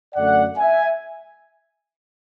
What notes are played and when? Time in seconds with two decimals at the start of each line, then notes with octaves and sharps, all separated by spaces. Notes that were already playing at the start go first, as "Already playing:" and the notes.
0.15 F#2 D3 A3 D5 F#5
0.58 E5 G#5